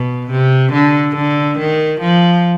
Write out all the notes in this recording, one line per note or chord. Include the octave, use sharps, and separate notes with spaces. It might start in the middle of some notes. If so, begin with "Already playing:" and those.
Already playing: B2
C3
D3
D3
D#3
F3